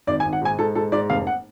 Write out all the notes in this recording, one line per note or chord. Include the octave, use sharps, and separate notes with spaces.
G#1 D5
G#5
G#1
F#5
G#2 G#5
G#2 A4
G#2 A4
G#2 D5
F1 F5
F#5